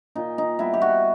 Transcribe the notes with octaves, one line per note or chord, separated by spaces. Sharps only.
A#2 D#4
D#4
G3 B3 E4
G4
F#4